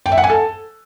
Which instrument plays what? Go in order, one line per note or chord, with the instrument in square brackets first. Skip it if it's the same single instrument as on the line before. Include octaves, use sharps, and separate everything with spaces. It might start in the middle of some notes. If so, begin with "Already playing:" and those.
[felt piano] G5
E5
F#5
G#5
A4